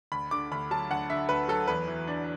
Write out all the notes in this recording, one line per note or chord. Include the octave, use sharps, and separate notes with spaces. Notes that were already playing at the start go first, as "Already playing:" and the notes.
D2 B5
D3 D6
D2 B5
F#3 A5
D2 F#5
D3 E5
D2 B4
F#3 A4
E2 B4
E3
D4